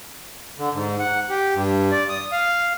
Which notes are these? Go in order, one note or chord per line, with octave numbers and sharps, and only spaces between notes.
D3
G#2
F#5
G4
G2
D5
D#6
F5